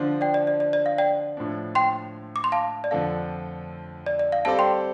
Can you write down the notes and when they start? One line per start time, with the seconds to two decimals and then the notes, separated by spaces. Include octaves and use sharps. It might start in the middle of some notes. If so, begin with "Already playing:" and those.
Already playing: D3 F3 D4 F4 C5
0.21 D5 G5
0.34 D5
0.47 D5
0.60 D5
0.73 D5
0.86 F5
0.98 D5 G5
1.37 A2 F3 D4
1.75 G5 C6
2.36 D6
2.44 C6
2.52 F5 A5
2.84 D5
2.91 F2 D3 F3 D4 A4 F5
4.06 D5
4.19 D5
4.32 F5
4.45 G3 C4 A4 D5 F5 A5
4.59 G5 C6